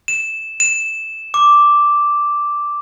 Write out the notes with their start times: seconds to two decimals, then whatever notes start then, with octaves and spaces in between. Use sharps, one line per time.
0.08 E7
0.60 E7
1.34 D6